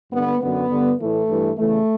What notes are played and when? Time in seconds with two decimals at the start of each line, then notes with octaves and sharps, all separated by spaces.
0.12 G2 D3 B3
0.41 F#2 D3 B3
0.70 G2 D3
0.99 A2 E3 A3
1.28 G2 E3
1.57 E2 C#3 E3 A3